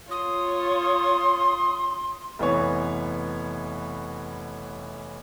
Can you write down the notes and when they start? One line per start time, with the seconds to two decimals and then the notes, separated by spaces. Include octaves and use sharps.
0.11 F4 C#5 C6 D#6
2.39 F1 E3 B3 C#5